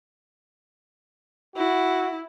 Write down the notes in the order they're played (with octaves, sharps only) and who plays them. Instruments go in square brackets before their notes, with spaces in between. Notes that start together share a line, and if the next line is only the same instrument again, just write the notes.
[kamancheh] E4 [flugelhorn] F#4